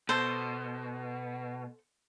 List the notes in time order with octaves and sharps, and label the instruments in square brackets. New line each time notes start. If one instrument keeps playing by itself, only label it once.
[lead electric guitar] B2 [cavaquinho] A4 C5